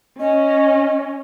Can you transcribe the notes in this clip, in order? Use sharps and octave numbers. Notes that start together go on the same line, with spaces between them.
C#4 D#5